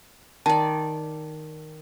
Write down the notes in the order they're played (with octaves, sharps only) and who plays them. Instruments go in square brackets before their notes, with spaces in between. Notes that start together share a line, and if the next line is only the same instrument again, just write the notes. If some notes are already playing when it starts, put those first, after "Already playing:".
[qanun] D#3 D5 [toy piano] A5